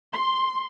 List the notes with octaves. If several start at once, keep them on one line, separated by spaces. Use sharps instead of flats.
C6